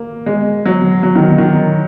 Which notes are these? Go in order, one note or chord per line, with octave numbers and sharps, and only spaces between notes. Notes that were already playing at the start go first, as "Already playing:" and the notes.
Already playing: A#3
G#3
F#3
F#3
D#3
D#3